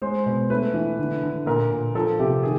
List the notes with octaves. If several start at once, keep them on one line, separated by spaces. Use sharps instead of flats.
G#3 C5
B2
A3 B4
E3
D3
D3
A#2 A#4
A#2
F3 A4
C3 G4
D#3 G#4